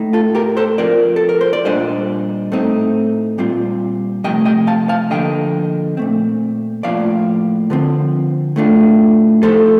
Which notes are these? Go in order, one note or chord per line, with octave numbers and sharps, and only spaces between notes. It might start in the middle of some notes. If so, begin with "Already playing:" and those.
Already playing: A2 A3 D#4
F4 A4
G4 A#4
A4 C5
F3 C4 F4 A#4 D5
A4
A#4
C5
D5
A#2 G3 D4 F4 C5 D#5
A2 A3 C4 D#4
A#2 G3 C4 F4
C3 F3 A3 D#5 G5
D#5 G5
F5 A5
F5 A5
D3 F3 A#3 D#5 G5
A#2 A3 C4
A2 F3 A#3 F4 D5 F5
D3 F3 C4
A2 A3 D4 F4
F3 A3 D#4 A4 C5